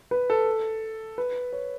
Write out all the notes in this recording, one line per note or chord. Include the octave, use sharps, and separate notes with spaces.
B4
A4
B4
C#5